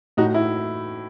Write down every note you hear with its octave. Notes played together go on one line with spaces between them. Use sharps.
A2 D#4 F#4
E4